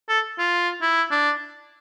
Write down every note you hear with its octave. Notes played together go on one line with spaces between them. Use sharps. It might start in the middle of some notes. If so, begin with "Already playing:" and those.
A4
F4
E4
D4